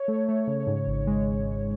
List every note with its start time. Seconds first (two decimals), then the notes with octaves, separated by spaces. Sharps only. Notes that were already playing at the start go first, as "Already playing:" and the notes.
Already playing: C#5
0.08 A3
0.29 A3
0.47 C#3
0.67 G#2
0.87 G#1
1.07 G#3